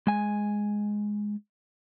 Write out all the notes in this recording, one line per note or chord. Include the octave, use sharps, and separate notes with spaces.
G#3 G#5